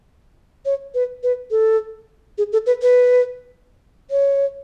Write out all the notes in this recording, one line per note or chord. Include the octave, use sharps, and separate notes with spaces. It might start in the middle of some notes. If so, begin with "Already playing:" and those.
C#5
B4
B4
A4
G#4
A4
B4
B4
C#5